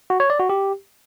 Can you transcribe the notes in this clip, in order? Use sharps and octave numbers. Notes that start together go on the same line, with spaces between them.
F#4
C#5
D5
F#4
G4